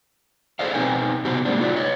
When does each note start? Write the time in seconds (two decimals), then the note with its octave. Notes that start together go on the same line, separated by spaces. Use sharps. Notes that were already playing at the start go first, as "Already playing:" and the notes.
0.59 G#4 A4 C5 D5 D#5 F5
0.74 B2 C4 D#4 B4 G5 G#5
1.25 C3 B3 D#4 F#4 G4 C5
1.45 G3 G#3 A#3 C4 D4
1.60 D#4 F4 F#4 D5
1.76 C#5 D#5